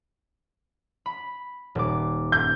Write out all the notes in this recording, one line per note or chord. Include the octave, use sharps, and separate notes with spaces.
B5
D#1 D6
G6